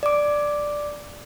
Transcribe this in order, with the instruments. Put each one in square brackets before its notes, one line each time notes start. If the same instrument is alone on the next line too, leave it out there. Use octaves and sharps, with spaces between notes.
[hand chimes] D5 D6